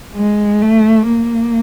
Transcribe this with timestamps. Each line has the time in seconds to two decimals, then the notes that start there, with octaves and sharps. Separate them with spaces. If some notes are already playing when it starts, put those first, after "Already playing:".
0.16 G#3
0.62 A3
1.08 A#3